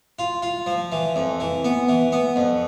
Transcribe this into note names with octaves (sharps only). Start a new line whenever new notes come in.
F4
F4
F3
E3
F2
E3
B3
E3
B3
F2